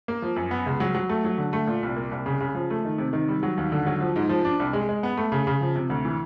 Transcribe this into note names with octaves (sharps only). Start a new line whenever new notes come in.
A#3
F3
F#2
B3
C#2
F#3
F#3
A3
F#3
D3
A3
A#2
C2
A#3
C2
C#3
C#3
F3
A3
D#3
C3
D#3
G3
F#3
D#2
D3
F#3
F3
G#2
F3
D4
C2
G#3
G#3
B3
A3
C#3
C#3
F3
C3
D2
E3